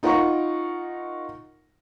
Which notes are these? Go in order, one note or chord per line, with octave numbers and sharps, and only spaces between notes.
D#4 F4 A#4 F#5 A#5 C#6